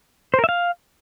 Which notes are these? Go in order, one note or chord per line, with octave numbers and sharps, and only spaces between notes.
C5
A#4
E5
F5